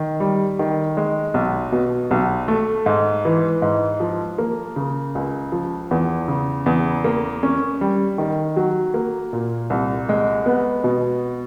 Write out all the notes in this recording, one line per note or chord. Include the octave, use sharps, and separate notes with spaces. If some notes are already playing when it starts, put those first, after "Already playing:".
Already playing: D#3
G3
D#3
G#3
B1
B2
B1
A3
G#2
E3
G#2
F3
A#3
C#3
C#2
F3
E2
C#3
E2
A#3
C#4
G3
D#3
F#3
A#3
A#2
C2
G#3
B3
B2